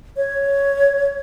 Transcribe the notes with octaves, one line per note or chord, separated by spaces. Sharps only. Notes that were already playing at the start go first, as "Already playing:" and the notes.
C#5